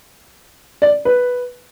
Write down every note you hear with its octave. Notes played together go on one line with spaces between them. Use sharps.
D5
B4